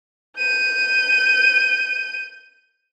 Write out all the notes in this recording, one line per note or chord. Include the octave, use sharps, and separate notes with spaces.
G6 D#7